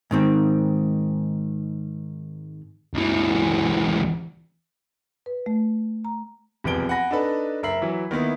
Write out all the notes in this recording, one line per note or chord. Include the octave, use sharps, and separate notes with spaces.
G#2 D#3 C4
C#2 E3
B4
A3
A#5
E1 C2 F2 B4 D7 G7
F#5 G#5 B5 A#6
D4 D#4 A4 B4
F#1 A#4 E5 C7 F#7
E3 F#3 E4
D#3 A#3 B3 E4